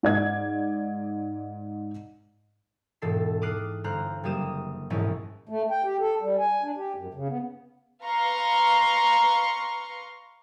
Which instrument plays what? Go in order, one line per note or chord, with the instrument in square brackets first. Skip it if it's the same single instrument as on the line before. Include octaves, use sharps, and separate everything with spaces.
[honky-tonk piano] G#2 D5 G#6
[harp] E1 G#2 A4 C7
D6 D#6 F6 F#6 C7 D7
G1 C5 A#5 F6 F#6
F#1 G3 A#3 G4 D#6 E7
E1 A#1 G#2 C#4 E4 D#5
[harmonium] A3
G5
G4
A4
G3
G#5
D4
G4
F#2
C#3
B3
[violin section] B4 F5 A#5 C6 C#6